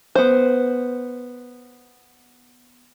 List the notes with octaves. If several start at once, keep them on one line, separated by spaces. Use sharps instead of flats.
B3 C5